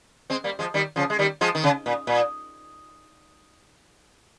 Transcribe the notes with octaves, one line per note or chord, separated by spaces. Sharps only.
G#3 C4
G3 A#3
F3 G#3
D#3 G3
C#3 F3
G#3
D#3 G3
F3 G#3
D#3
C#3
A#2
A#2